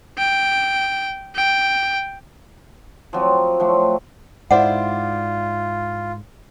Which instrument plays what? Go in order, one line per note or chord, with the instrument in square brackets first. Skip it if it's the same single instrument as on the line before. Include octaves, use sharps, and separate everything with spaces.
[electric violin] G5
G5
[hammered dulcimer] F3 F#3 C4
F3 F#3 A3
[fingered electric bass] G#2 [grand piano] E4 C5 D5 [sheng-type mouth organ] F4 [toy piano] F#5